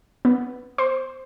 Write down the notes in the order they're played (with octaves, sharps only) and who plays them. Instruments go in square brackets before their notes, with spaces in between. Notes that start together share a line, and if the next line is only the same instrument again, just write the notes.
[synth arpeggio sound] B3
C5